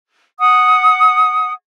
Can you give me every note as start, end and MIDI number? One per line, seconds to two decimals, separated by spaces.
0.39 1.51 78
0.39 1.51 87